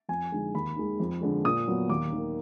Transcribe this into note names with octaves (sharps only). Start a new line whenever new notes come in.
F2 G#5
D3 G#3 D#4
D#2 B5
D#3 G#3
F2
D3 G#3
A#2 D#6
F#3 B3
D#2 D6
D#3 A#3